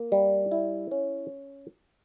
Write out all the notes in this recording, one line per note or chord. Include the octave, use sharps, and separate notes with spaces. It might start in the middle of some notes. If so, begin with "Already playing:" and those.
Already playing: A#3
G3
E4
C#4